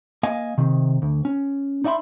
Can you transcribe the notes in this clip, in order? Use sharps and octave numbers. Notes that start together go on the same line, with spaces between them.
A#3 D#5 F5 G#5
C3 D#3
D2
C#4
D#4 D5 E5 G5 B5 C6